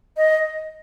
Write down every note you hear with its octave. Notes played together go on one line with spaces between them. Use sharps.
D#5